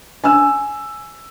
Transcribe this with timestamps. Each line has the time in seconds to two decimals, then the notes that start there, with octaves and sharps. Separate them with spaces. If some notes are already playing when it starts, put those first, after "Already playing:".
0.24 G#5 E6